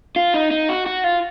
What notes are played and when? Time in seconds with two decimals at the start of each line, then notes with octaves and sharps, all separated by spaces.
0.16 F4
0.34 D#4
0.51 D#4
0.69 F#4
0.86 F#4
1.04 F4